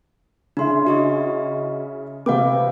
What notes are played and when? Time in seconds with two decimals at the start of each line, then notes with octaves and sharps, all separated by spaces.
0.57 C#3 D4 E4 C6
0.87 F#4 D#5 C#6
2.26 C3 B3 F5 G5 D6